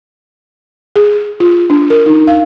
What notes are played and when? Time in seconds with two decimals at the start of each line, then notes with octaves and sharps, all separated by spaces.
0.96 G#4
1.40 F4
1.70 D4
1.90 A#4
2.06 D#4
2.27 F5